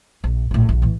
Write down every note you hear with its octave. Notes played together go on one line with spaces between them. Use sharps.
A#1
A#1 A2
A#1 D3
A2 E3